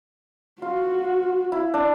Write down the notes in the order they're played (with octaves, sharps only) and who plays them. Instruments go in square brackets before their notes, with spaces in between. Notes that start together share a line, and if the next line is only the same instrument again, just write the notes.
[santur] F4 [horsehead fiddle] F#4
[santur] E4
D4